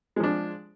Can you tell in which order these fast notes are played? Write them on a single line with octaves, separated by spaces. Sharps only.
G#3 F3 D4